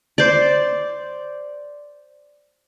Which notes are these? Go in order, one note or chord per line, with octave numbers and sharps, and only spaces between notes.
C5 D5